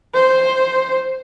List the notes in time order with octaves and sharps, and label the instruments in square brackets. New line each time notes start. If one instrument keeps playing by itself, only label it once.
[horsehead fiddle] C5